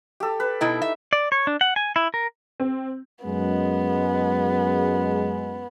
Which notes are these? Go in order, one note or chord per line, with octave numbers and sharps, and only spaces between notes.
G4 A4
B4
B2 D#4 E4 G5
E5
D5
C#5
D4
F#5
G#5
E4
A#4
C4
F#2 G#3 B3